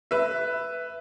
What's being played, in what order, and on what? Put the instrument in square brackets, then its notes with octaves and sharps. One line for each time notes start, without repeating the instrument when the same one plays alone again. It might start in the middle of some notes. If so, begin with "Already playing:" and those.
[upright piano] B4 E5